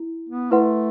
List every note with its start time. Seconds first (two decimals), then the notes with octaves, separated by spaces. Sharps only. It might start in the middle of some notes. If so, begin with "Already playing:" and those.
Already playing: E4
0.29 B3
0.51 A3 E4 B4 F#5 C6